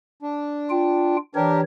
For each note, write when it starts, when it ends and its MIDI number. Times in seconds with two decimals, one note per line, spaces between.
0.22 1.17 62
0.70 1.16 65
0.70 1.16 79
1.35 1.63 52
1.35 1.61 62
1.35 1.61 67
1.35 1.61 70
1.35 1.63 73